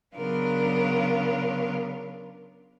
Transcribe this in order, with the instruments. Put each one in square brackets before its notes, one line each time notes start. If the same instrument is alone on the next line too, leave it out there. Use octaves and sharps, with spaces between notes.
[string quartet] C#3 F#3 B3 D4 F4 A#4